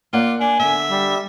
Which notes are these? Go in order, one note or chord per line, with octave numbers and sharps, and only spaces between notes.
A#3 F4 D5 F#5
D4 G#5
D3 B3 E5
G3